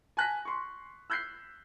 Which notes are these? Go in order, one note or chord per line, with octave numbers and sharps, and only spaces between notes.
G#5 A5 F#6 A#6 B6
C6 C#6
E6 F#6 G6 B6 C7